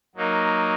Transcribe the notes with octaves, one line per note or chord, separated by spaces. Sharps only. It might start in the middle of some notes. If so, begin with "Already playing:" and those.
F#3 A#3 D#4